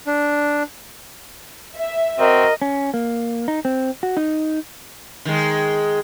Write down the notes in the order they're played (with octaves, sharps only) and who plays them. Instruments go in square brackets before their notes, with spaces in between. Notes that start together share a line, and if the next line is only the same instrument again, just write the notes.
[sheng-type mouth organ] D4
[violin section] E5
[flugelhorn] C4 [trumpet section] F#4 A#4 [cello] D#5
[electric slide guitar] C#4
A#3
D#4
C4
F#4
D#4
[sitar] D#3 G#3